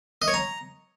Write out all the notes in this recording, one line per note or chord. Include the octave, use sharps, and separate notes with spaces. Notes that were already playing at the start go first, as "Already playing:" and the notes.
D#5
C#5
A#5